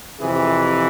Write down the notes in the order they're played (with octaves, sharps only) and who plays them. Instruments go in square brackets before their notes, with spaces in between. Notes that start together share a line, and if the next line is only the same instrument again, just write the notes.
[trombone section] F2 C3 E3 G#4